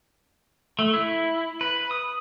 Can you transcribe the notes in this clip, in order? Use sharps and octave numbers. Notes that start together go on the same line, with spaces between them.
A3
E4
B4
D#6